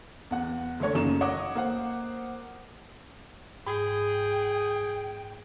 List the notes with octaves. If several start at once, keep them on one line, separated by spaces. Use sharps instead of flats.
E2 F#5
D3 A3 D4 C#5 C#6
F#2 C#3 A#3 D#4 E7
C#5 D#5 F#5 D6 D#6
A#3 C5 F#5
G#2 G#4 G5